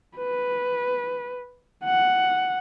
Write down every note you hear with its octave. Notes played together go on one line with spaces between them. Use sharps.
B4
F#5